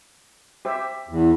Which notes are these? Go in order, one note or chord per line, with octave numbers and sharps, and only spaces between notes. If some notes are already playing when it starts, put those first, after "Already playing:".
G4 C5 E5
E2